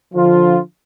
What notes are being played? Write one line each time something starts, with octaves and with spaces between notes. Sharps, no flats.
D3 F3 F4